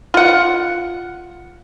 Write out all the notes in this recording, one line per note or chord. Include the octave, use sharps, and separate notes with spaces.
F4 F#5